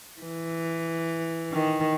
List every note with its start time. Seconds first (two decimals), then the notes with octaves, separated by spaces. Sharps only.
0.22 E3
1.52 D#3